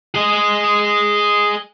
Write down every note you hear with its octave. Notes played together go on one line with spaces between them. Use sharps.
G#4 D#5